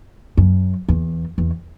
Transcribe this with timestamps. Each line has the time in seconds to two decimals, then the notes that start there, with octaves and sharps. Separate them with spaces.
0.37 F#2
0.89 E2
1.38 E2